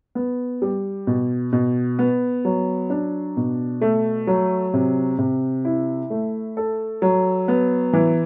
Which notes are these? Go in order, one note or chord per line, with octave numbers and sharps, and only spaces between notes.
B3
G3
B2
B2
B3
F#3
D4
B2
A3
F#3
C3
C3
E4
A3
A4
F#3
B3
E3